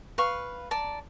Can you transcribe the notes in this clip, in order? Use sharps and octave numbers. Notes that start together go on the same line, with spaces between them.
B4 F5 C#6
D5 A5 A#5